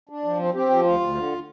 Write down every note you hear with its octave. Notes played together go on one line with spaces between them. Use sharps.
D4
F3
C4
C4 G4
F3
D2 F4
D2
D3